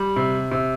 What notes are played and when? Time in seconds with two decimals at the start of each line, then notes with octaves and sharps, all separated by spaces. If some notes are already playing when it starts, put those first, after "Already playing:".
Already playing: G3
0.16 C3
0.51 C3